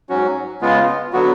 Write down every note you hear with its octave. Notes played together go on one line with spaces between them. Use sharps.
G#2 F#3 C#4 F#4
C#3 G#3 B3 F4
D3 F#3 B3 F#4